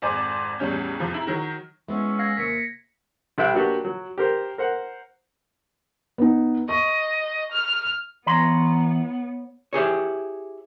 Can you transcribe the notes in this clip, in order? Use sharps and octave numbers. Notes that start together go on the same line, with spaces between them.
G#1 F2 C5 D5 G#5 D6
A1 E2 G3 C#4 G6
F2 C3 F3
E4 A#5
D#3 F#3
G#3 B3 C#4 E4 C#6 E6
F5 G#6 A#6 C7
D#2 C3 A#3 B6 C#7
C2 B4 E5 G5 F#6
F#3 A#3 D4 F#4 G4 B4
F#3
G4 A#4 C5
A#4 C5 F#5
B3 D#4
D#5 C#6
F6
E3 B3 C#5 A#5 C6
E4 G4 G#4 C#5